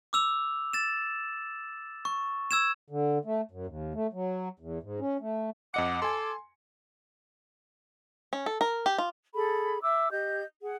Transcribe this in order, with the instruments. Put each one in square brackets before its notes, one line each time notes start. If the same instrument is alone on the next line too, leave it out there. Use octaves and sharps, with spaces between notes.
[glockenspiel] D6 E6 F7
A6 E7
C#6
E6 G#6 E7
[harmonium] D3
A3
F#2
D#2
A3
F#3
E2
G#2
C#4
A3
[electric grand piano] F2 D#5 C#7 [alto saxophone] F#5 [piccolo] D6
[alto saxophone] A4 [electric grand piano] G#5 C6
[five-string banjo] C#4
A4
A#4
G4
F4
[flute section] G#4 A4 B5
E5 D6 E6
G4 D#5 G6
G#4 F#5